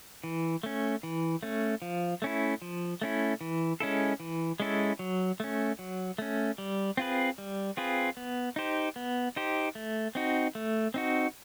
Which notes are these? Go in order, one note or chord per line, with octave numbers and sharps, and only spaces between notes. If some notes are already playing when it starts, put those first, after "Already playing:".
E3
A3 C#4
E3
A3 C#4
F3
A3 C#4 E4
F3
A3 C#4 E4
E3
G#3 C#4 E4 A4
E3
G#3 C#4 E4 A4
F#3
A3 C#4
F#3
A3 C#4
G3
C4 F4 G#4 B4
G3
C4 F4 G#4 B4
B3
D#4 G4 C5
B3
D#4 G4 C5
A3
C4 D#4 F#4
A3
C4 D#4 F#4